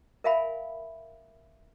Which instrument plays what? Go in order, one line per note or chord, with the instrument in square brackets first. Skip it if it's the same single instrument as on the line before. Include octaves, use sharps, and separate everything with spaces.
[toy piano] A#4 E5 F5 G#5 B5